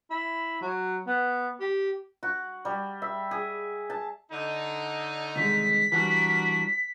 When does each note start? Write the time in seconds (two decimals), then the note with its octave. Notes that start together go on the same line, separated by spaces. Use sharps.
0.11 E4
0.61 F#3
1.07 B3
1.60 G4
2.23 F#4
2.65 G3
3.02 E5
3.31 G#4
3.90 A5
4.31 D3 D#4
5.36 C2 D#3 G#3 B6
5.92 E3 G3 D4 F#4 A#4